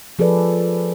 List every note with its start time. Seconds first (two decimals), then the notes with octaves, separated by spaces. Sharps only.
0.19 F3 G#4 A4 B4 D5